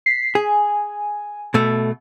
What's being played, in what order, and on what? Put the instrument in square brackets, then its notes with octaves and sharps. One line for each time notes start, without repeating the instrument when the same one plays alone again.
[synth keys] B6 C7
[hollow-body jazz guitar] G#4 [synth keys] G#5
[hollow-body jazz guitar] B2 A3